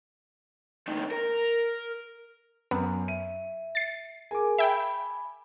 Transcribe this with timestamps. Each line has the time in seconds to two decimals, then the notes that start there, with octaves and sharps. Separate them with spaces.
0.88 C#2 D#3
1.11 A#4
2.71 F#2 B3
3.08 E5 D#7
3.75 A6 C7
4.31 G#4 A#4 G#5 D6
4.58 E5 G5 B5